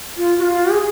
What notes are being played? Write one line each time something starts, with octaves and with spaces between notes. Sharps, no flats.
F4
F#4
F4
G#4